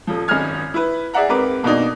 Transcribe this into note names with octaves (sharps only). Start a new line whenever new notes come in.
D#1 F3
G#1 F#2 D#5 G#5 F6 G#6
E4 B4
G#4 D5 E5 F#5 A#5
G#2 C4 A#4 B4 D6
F2 B2 A#3 D4 D#4